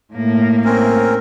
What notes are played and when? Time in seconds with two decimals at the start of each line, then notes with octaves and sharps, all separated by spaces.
0.14 A2 A#3
0.65 C4 C#4 A#4